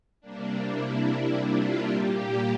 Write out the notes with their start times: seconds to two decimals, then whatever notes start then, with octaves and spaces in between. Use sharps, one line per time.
0.21 C3 G3 A#3 D4
0.64 E4
1.05 E4
1.47 F4
1.88 A#2 G3 A#3 G4